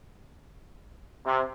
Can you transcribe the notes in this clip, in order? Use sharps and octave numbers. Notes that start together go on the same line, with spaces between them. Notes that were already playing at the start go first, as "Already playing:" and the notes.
C3